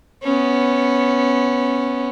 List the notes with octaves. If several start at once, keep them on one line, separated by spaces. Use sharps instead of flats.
B3 C#4